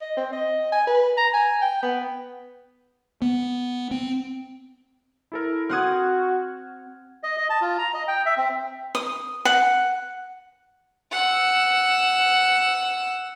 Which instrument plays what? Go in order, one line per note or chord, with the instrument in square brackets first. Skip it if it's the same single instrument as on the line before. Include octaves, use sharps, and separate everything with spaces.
[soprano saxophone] D#5
C4
D#5
G#5
B4
A#5
G#5
G5
B3
[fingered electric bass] B3
C4
[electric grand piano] E4 A4 A#4
[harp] C4 F#5 D#6 [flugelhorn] F#4 [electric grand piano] F6 G#6
[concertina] D#5
D#5
A5
F4
A#5
D#5
G5
E5
C4
[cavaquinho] D#6
F#5
[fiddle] F#5 E6